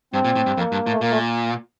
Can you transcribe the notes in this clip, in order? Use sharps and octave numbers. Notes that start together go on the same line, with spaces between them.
G2 C4
A#2
A2
G2
F2 A#3
G2
A2
A3
A#2 A#3
A3